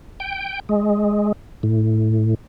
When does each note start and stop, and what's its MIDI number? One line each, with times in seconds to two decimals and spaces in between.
0.20 0.60 79
0.69 1.32 56
1.63 2.34 45